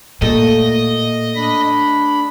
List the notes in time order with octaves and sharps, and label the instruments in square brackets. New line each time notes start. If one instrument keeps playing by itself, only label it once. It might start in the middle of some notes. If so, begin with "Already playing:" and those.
[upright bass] A#2 [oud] A3 G4 A4 [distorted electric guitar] D#5
[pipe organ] D4 B5